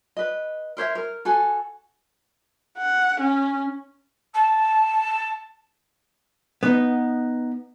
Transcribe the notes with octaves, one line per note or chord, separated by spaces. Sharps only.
B4 D#5
A#4 C5 C#5 E5
A#4
F#4 A4 G#5
F#5
C#4
A5
B3 D#4